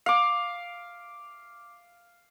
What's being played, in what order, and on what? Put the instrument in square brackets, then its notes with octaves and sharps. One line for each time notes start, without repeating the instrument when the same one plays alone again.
[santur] F5 D6